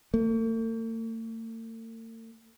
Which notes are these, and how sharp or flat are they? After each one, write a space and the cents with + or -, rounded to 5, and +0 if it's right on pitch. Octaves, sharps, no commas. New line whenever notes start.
A3 +45